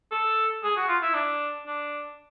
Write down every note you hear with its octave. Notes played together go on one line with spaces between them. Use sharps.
A4
G#4
F#4
F4
E4
D4
D4